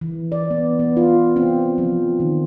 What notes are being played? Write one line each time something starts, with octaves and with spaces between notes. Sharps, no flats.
E3
D5
B3
B3
F4
C4
F3
D#3